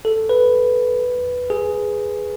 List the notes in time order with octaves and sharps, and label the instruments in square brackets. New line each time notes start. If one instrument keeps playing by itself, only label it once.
[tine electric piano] A4
B4
G#4